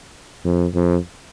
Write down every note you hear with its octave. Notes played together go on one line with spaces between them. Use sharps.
F2
F2